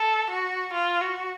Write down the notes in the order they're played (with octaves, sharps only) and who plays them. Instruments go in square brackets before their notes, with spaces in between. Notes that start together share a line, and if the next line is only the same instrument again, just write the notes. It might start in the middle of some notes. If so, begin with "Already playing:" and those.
Already playing: [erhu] A4
F#4
F4
F#4